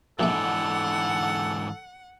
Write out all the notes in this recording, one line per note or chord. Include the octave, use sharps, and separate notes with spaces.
A#1 G#2 D3 E3 A4 E5 F#5